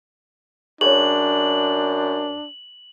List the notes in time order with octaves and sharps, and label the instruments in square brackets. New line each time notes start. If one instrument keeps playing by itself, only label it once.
[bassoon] F#2 [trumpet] D4 [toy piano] G#4 C#5 [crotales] F#7